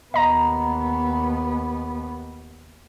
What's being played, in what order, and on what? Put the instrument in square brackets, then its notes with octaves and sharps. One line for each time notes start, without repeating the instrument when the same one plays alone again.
[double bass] D#2 B3 [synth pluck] D#5 A#5